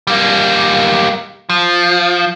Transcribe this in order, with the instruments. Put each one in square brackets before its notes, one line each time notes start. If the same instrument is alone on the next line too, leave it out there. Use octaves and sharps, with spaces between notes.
[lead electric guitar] G3 A#3
F3